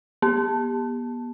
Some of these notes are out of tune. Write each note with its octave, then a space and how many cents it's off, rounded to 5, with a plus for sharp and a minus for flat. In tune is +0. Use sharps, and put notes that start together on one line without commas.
B3 -35